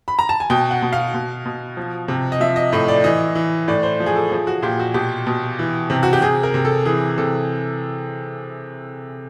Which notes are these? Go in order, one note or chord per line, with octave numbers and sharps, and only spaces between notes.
B5
A#5
A5
G#5
B2 G5
F#5
B2
F5
B2
B2
F3
C3
D#5
F3 E5
D#5
A2 D#5
D5
E3 D#5
E3
A2 D5
C5
F3
G#4
A4
F3 G#4
F#4
A#2 G4
F#4
B2 G4
B2
E3
C3
F#4
G4
C3 G#4
A#4
C3
A4
E3 G#4
C3 A4